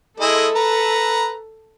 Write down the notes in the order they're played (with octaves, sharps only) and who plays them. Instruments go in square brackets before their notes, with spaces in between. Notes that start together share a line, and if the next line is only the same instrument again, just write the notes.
[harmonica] G#3 E4 D#5 [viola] A4
[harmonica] B4 A#5